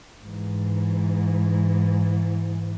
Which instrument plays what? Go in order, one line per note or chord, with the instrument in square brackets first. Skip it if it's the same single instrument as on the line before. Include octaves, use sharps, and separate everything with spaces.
[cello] G#2 E3